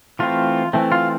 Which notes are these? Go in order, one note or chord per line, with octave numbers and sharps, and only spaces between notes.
E3 A3 C4 F4
E3 A3 C4
F4